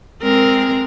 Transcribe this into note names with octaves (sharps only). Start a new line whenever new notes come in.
G#3 C4 A#4